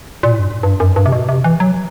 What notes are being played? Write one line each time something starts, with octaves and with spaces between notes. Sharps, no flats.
A#2
A2
G2
G#2
G2
F#2
G2
C3
B2
C3
E3
F#3